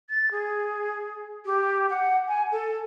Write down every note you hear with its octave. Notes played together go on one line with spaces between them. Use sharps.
A6
G#4
G4
F#5
G#5
A4